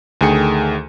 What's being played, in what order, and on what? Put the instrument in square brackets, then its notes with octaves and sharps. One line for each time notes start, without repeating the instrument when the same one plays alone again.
[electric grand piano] D2 D#3 A3 G#4 G5 C#7